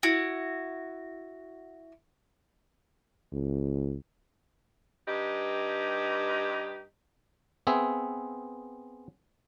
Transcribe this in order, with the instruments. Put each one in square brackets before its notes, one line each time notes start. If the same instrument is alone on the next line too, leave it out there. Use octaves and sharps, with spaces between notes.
[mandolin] E4 F#4
[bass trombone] C#2
[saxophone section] G2 D#4 G4 B4
[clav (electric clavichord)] B3 C4 G#4 E5